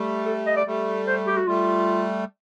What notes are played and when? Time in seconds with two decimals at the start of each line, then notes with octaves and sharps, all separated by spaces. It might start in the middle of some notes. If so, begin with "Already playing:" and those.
Already playing: G3 A3
0.25 A4
0.46 D#5
0.56 D5
0.67 G3 A3
1.07 C5
1.27 G4
1.37 F#4
1.47 G3 A3 F4